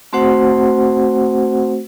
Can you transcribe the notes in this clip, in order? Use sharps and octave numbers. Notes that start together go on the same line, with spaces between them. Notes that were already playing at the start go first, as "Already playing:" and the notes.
A3 C4 F#4 C5 F#5